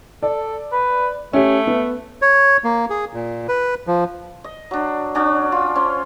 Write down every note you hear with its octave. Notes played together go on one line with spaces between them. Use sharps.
A4 D5
B4
A3 C#4 G4
B3
C#5
A#3
G#4
A#2
B4
F3
D#5
F#3 D4
C#4 D4 F#4 D5
F4
C#4 C5